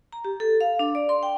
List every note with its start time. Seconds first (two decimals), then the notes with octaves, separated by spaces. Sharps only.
0.13 A#5
0.25 G4
0.40 A4
0.61 F5
0.79 D4
0.95 D5
1.09 C6
1.23 G5